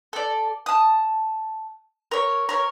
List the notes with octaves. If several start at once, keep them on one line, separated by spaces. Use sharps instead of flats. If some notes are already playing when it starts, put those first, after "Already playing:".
A4 D5
A5 D#6
A#4 C#5
A#4 C#5